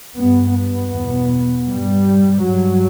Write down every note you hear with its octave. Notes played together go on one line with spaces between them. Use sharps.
G2 B3
B3
E2 B2
G2 G3
G2 F#3